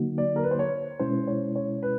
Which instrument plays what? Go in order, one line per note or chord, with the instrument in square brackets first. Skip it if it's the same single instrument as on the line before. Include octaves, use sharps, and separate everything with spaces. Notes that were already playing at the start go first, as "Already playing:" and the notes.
Already playing: [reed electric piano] D3 F#3 A#3 D#4 F#4
[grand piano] D5
A#4
B4
C5
C#5
[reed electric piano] B2 G#3 C#4 E4 [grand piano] C5
[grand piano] C#5
C#5
B4